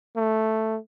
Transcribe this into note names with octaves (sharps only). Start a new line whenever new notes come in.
A3